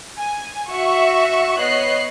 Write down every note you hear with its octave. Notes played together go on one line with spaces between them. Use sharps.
G#5
F#4 E5 C#6
B3 C#5 D#5 F#6 C7